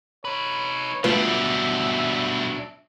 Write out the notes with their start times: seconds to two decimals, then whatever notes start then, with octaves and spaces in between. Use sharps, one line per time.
0.25 D#4 B4 C#5
1.04 B2 F#3 G3 A3 D4 F4 B4 E5